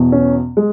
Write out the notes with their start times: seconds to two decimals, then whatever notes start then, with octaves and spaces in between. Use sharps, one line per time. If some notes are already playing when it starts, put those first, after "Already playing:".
Already playing: E2 B2
0.12 C#4
0.57 G#3